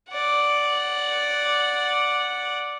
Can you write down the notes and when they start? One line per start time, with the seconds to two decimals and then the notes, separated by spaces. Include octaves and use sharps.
0.11 D5 F#5